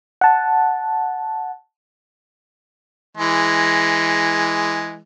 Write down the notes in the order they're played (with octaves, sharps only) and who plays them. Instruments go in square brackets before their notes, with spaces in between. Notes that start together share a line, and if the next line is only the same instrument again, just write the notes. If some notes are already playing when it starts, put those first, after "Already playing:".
[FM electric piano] F#5 A5
[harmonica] E3 G#3